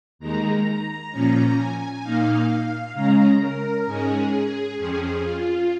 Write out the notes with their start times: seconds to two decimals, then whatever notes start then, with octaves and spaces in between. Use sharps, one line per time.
0.19 D#2 D#3 G#3 A#5
1.11 A#2 F3 C#4 A#5
1.57 G#5
2.02 A#2 A#3 D#4 F5
2.94 C#3 G#3 C#4 A#5
3.40 A#4
3.86 G#2 G#3 C#4 G#4
4.77 F2 F3 C#4 G#4
5.23 F4